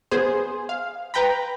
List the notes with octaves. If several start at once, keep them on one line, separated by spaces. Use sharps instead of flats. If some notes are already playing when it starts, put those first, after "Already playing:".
B3 G#4 C5
F5
B4 G5 A#5 B5